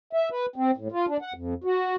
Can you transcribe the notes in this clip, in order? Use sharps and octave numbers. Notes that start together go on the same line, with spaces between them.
E5
B4
C4
A2
F4
D4
F#5
F2
F#4